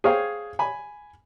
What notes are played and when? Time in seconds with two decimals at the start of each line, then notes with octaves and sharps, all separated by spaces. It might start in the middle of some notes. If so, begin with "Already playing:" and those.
0.04 G#4 C5 C#5 F5 G5 G#5
0.59 G#5 B5